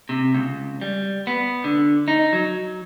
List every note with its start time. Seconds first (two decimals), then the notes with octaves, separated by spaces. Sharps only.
0.09 C3
0.34 C#2
0.81 G3
1.27 B3
1.64 D3
2.08 D#4
2.33 F#3